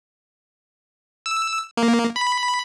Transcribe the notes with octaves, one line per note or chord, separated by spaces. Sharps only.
E6
A#3
B5